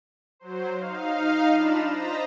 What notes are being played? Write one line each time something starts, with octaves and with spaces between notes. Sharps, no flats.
F#3 C5
D#4 F5
D4 F4 A#5 B5 E7
C5 D#5 A#5 A6 B6